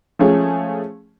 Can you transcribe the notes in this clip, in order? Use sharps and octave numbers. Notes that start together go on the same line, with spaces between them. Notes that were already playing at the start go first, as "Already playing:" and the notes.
F3 G#3 A3 C#4 G#4